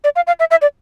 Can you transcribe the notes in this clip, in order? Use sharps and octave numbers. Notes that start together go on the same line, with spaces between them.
D5
F5
F5
E5
E5
D5